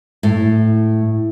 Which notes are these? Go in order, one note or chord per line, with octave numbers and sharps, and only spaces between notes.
A2